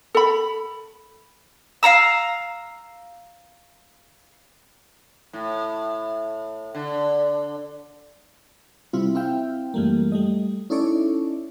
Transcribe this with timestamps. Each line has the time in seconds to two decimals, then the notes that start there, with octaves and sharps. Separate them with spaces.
0.15 A4 B5
1.83 F5 F#5 A#5 E6
5.33 A2
6.75 D3
8.93 C3 G3 C4 E4 F4
9.15 C4 E4 E5 F5 G5
9.74 F#2 E3 G3 A3 A#3
10.12 G3 A3 D#5
10.70 C#4 D#4 E4 A4 C#5 D5